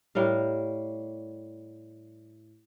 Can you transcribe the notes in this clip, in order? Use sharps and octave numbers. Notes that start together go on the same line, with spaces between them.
A2 G3 A#4 F5